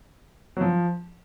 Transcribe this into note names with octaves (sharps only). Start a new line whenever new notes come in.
F#3
F3